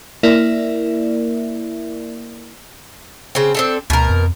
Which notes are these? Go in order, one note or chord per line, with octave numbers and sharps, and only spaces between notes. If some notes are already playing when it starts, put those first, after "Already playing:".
A#3 E4 A#4 D5 E5
C#3 C4
C4 D4 A4
D2 B2 A#4
F2